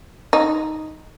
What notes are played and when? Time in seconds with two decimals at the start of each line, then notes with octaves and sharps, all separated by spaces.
0.33 D#4